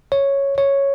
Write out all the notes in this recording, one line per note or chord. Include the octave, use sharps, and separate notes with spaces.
C#5
C#5